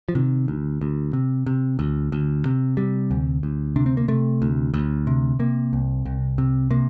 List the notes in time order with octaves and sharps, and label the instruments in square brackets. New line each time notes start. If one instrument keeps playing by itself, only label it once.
[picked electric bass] F3
C3 D#3
D2
D2
C3
C3
D2
D2
C3
C3 G3
D2
D2
C3 D4
C4
A#3
C3 A3
D2
D2
C3
C3 A#3
C2
C2
C3
C3 A#3